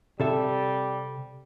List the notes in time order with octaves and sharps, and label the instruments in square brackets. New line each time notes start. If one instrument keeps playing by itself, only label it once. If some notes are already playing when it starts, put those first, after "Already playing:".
[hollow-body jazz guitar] C3 A4 E5 [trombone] G3